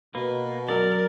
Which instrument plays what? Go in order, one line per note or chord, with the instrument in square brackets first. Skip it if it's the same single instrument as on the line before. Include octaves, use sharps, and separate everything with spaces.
[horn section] B2 [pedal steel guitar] A#3 [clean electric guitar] B4
[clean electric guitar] F#2 F#3 [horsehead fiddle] A#4 [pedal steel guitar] D5